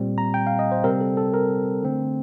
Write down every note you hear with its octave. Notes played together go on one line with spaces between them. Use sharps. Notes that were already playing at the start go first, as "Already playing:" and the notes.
Already playing: A#2 G3 C4
A#5
G5
F5
D#5
C5
C3 G3 C4 A#4
A4
A4
A#4
D3 A3 C4